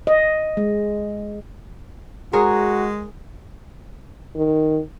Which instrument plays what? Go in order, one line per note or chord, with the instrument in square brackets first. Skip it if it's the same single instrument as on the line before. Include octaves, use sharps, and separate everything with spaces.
[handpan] D#5
G#3
[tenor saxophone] G#3 [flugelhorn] F#4 [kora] G#4 A#4 C#5
[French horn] D#3